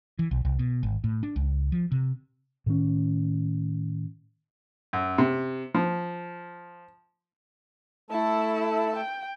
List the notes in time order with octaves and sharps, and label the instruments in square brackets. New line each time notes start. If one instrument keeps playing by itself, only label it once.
[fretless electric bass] E3
B1
C2
B2
G#1
A2
D4
C#2
F3
C3
[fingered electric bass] A2 D#3 C#4
[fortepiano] F#2
C3
F3
[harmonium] A3 A4 A5 [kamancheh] E4
[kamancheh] G5